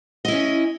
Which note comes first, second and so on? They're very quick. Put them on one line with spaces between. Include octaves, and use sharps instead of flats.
D#5 E4 C#4